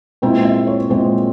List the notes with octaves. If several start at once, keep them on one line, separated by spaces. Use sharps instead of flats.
A#2 G#3 C4 E4 G5
E5
C#5
A#2 G#3 C4 E4